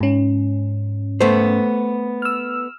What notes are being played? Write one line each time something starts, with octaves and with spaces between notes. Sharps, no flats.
G#2 C#4
A3 B3 C5
E6 F6